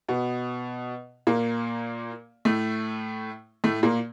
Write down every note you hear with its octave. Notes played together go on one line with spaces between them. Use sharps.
B2 B3
A#2 A#3
A2 A3
A2 A3
A#2 A#3